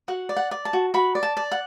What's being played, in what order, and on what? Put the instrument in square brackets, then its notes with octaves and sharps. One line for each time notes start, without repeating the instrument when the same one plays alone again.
[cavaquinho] F#4 F#5
D5
F#5
D5
A5
F#4
F#4 B5
D5
A5
D5
F#5